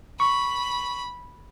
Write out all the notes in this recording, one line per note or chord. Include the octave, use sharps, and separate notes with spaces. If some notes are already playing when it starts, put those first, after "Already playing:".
B5 C#6